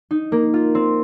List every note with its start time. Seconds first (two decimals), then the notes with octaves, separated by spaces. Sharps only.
0.11 D#4
0.32 A#3
0.54 F4
0.75 C4